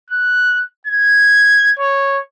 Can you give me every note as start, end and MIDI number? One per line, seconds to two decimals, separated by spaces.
0.10 0.62 90
0.87 1.74 92
1.79 2.18 73